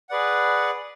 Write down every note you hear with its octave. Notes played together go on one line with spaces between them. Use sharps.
G#4 B4 D5 F#5